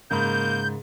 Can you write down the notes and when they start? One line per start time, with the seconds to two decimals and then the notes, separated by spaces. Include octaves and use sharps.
0.11 G#2 C#3 A#3 A#4 B5 G6